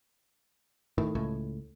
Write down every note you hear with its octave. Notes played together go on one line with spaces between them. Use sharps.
A2 D#3
C#2 A2